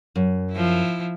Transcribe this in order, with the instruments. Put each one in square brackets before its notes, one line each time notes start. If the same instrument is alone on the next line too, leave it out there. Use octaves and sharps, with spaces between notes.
[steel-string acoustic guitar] F#2
[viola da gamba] F3 E4